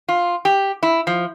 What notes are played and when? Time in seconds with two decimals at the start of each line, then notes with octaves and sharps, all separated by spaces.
0.09 F4
0.45 G4
0.83 E4
1.07 F3